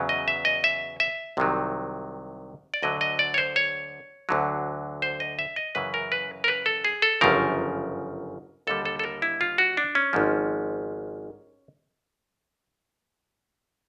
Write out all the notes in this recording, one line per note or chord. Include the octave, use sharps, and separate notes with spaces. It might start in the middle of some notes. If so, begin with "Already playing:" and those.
Already playing: E2 C#3 F#3
D#5
E5
D#5
E5
E5
C2 C3 D#3 F#3
D5
D2 D3 F#3 D#5
D#5
D5
C#5
C5
C#5
D2 D3 F#3
C5
D#5
E5
D#5
F#2 C#3 E3 B4
A#4
B4
A#4
B4
A4
G#4
A4
G1 F#2 C#3 F3 A#4
D#2 D3 G3 A4
A4
A4
A#4
E4
F4
F#4
D4
C#4
G#1 G#2 F3